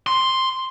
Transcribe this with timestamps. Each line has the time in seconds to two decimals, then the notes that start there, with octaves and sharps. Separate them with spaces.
0.07 C6